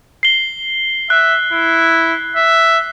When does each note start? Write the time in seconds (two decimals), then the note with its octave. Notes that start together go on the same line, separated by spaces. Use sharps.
0.23 C7 G7
1.10 E5 F#6
1.53 E4
2.36 E5